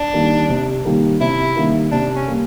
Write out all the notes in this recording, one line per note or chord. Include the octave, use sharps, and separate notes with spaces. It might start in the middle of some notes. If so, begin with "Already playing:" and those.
Already playing: D4
D#3 G3 A#3
C3
D#3 G3 A#3
C3 E4
D#3 G3 A#3
C3 D4
C#4
G3 A#3